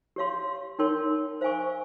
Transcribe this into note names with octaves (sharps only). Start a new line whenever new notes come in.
G4 C#5 F5 C6
D#4 A#4 C#5 G5 C6
C5 F5 G#5 C#6